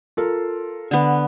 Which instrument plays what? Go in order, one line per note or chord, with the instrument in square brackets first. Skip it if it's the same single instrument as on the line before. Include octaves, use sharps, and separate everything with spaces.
[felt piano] F4 A4 A#4
[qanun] D3 B3